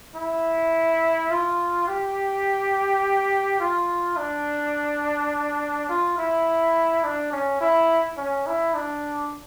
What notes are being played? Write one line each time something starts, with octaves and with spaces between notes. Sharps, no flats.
E4
F4
G4
F4
D4
F4
E4
D4
C#4
E4
C#4
E4
D4